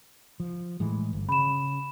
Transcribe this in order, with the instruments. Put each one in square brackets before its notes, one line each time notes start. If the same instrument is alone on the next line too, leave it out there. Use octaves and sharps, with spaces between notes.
[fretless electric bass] F3
A2 E3 G#3
G1
[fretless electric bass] C#3 [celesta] B5 E7